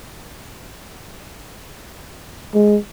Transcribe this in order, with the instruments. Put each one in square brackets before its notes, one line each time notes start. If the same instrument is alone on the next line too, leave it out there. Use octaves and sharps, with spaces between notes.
[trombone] G#3